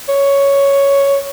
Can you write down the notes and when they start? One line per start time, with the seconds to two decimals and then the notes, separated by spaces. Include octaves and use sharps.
0.08 C#5